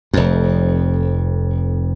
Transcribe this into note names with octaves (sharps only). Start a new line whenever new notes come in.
F1 F2